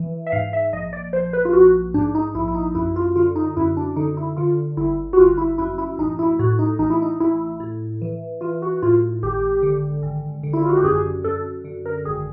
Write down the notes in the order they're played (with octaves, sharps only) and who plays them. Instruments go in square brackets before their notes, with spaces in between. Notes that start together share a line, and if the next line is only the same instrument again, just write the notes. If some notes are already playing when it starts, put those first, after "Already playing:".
Already playing: [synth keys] E3
E5
G#2 F5
E5
A#1 D#5
D5
A#1 C5
B4
F4
A#1 F#4
G#2 D4
D#4
A#1 E4
E4
D#4
F#2 E4
F4
D3 F4
D#4
F#2 E4
D4
D3 D#4
E4
D3 F4
G1 E4
F#4
G1 F4
E4
F#2 E4
E4
A1 D#4
E4
A2 F#4
D#4
A1 D#4
E4
D#4
A1 E4
A2
E3
E3 F4
F#4
A2 F4
G#1 G4
D3
G#1
D3
E4
F4
F#4
G4
F#2 G#4
F#2 A4
D3
A#4
G#1 G#4